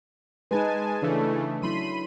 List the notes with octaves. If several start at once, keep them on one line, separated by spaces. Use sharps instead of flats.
G#3 D#4 G#4 B4 G#5 A5
C#3 E3 A3 D4 A4
F#3 E4 B5 C6 D#7